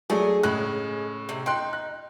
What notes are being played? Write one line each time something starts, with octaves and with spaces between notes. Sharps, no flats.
F#3 A3 D4 G#4
A2 C#3 G#3 F#6
C3
D#4 G5 C6 F#6
F#6